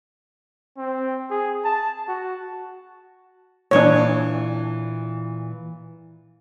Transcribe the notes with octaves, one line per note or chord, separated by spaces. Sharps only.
C4
G#4
A5
F#4
A#2 E3 D4 C#5